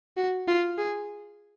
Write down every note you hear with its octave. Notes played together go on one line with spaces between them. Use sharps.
F#4
F4
G#4